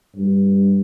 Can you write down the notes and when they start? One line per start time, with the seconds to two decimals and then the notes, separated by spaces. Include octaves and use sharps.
0.16 G2